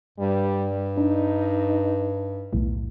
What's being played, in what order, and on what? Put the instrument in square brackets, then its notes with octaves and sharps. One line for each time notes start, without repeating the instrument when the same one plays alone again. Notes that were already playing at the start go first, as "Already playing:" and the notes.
[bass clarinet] G2 [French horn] G3
[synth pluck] D4 [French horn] D#4
[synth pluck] B1 E2 A2